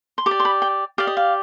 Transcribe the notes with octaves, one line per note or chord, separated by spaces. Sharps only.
C6
G4 D6
D5
C6
B5
G5
G4 D5 F5
D#5
F5